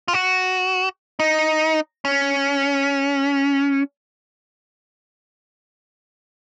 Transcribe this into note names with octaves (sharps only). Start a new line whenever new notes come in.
F4
F#4
D#4
C#4